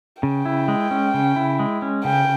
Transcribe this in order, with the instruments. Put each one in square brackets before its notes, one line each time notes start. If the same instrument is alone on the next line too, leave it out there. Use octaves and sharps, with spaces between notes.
[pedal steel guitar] C#3 [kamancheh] G5
[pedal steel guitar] E4
G#3
C#4
C#3
E4
G#3
C#4
[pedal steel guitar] C#3 [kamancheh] G5